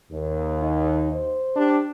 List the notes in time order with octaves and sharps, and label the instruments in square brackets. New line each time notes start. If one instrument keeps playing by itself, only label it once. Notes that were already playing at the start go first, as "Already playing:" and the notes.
[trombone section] D#2
[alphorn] D#4
C5
[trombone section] D4 G4